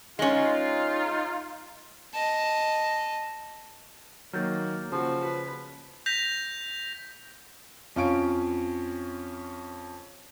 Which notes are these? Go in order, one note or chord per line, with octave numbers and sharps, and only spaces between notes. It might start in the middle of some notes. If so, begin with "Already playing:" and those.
G#3 C#4 D#4 F4
D#5 A5
D#3 F#3 A#3 F6 G6 A6
C#3 F3 F#4
B4
G6 A#6 B6 F7
F2 C#4 F4 F5 C#6 D7